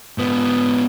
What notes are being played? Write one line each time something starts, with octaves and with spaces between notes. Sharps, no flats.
G#2 B3